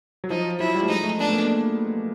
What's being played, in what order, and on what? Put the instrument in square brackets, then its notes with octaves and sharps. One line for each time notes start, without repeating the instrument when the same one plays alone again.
[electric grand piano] F#3
[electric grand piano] F3 [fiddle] D#4
[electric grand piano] F#3 [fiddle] E4
[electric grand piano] G3
A3
[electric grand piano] G#3 [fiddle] D#4
[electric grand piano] A3
[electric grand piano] B3 [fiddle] D4
[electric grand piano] A3
A#3